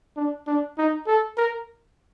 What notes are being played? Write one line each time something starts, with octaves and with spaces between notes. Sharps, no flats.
D4
D4
D#4
A4
A#4